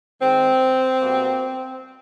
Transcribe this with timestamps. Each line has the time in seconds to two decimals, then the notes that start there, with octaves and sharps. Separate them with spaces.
0.21 D#3 G#3 C4
1.01 B2 G3 A#3